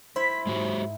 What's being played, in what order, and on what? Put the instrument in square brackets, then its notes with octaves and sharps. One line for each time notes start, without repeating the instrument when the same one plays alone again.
[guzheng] E4 [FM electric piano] C5 [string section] B6
[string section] G#2 [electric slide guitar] G#3 F#4 G4